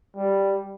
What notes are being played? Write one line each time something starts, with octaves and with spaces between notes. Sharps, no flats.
G3